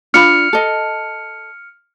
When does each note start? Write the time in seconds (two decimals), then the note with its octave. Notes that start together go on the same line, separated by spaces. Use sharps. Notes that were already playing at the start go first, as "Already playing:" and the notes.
0.14 D4 F4 B5 F6 C#7
0.53 A4 D#5